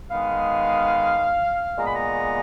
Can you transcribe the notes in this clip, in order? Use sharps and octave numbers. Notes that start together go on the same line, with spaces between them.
D#3 G#3 B3 F5
A#2 G#3 B3 A#5
B5
A#5